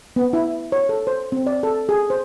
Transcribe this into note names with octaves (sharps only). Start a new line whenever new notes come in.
B3
E4
C#5
A4
C5
C4
D5
A4
G#4
C5